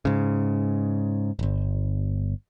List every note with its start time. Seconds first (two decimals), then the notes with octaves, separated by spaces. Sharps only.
0.05 G#2 C#3
1.39 D1 G1